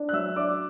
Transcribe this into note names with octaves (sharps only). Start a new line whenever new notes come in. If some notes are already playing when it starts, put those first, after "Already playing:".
Already playing: D4
F#6
F#3 E5 E6
D4 D5 D6